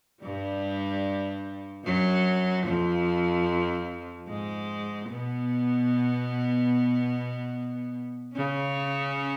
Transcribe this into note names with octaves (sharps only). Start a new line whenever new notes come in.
G2 G3
F#2 F#3
F2 F3
G#2 G#3
B2 B3
C#3 C#4